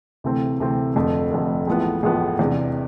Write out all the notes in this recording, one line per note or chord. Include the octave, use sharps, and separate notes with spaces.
D2 C3 E3 A3 C4
D2 C3 E3 A3 C4
F1 F2 D3 A3
F1 F2 D3 A3
A1 A2 F3 G#3 B3
A1 A2 F3 G#3 B3
E2 C3 G#3 D4